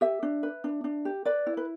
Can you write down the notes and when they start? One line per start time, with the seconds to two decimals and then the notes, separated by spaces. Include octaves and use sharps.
0.01 G4 E5
0.23 D4
0.43 B4
0.64 D4
0.84 D4
1.05 G4
1.25 B4 D5
1.47 E4
1.57 B4